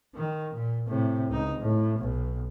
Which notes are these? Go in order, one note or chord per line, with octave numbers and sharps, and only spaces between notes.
D#3
A#2
A2 C3
C#2 D#4
A2
B1